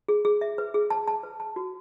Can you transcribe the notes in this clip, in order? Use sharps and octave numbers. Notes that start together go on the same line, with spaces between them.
G#4
G#4
E5
B4
G#4
A5
A5
B4
A5
F#4